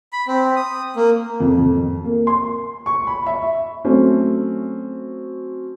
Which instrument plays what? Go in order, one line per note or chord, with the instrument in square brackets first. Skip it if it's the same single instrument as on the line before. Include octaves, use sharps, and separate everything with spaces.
[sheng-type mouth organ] B5
C4
D#6
A#3
[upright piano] F2
F2
A#3
C6
C#6
B5
E5
F#3 A3 C4 C#4